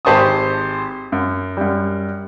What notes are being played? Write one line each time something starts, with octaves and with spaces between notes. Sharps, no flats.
G#1 G4 C5 A5 C#6 D#6
F#2
F#2 G3